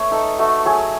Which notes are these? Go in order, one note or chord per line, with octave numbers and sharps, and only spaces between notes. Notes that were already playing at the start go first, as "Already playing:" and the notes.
Already playing: A3 B4 C#5
D#4 A4
A3 F#4
F#3 G#4